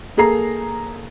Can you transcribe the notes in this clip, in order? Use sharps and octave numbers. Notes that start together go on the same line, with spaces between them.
A#3 G#4 A4 A#5 C7